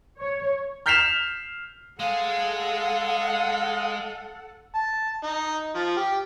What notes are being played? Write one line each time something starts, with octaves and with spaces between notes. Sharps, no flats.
C#5
F6 G6 B6 C7 E7 F7
G#3 G#4 A4 F5 F#5
A5
D#4
F3
G4